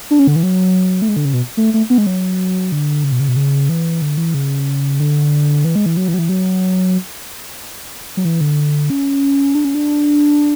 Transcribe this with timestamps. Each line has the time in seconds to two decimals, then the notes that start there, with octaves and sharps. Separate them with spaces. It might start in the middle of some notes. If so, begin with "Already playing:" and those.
0.11 D4
0.19 C#4
0.27 D3
0.36 E3
0.43 F#3
1.02 A3
1.09 G#3
1.16 D3
1.25 C#3
1.33 B2
1.57 A3
1.74 A3
1.90 B3
1.98 G#3
2.06 F#3
2.72 D3
3.04 C#3
3.12 B2
3.20 C#3
3.28 B2
3.36 C#3
3.69 E3
4.02 D3
4.18 E3
4.34 C#3
5.00 D3
5.64 E3
5.75 G#3
5.86 E3
5.97 F#3
6.08 E3
6.14 F#3
6.18 E3
6.29 F#3
8.17 F#3
8.25 E3
8.41 D3
8.90 C#4
9.55 D4
9.65 C#4
9.75 D4